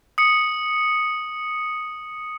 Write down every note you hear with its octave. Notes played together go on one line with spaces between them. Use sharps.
D#6 C#7